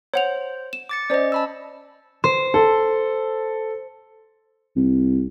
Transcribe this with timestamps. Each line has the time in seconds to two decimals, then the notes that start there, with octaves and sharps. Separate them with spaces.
0.14 C5 C#5 F#5 F7
0.73 E7
0.89 D6 A6 C#7
1.10 C#4 C5 D5 D#5
1.32 A5 B5 E6
2.24 C5
2.54 A4
4.76 C2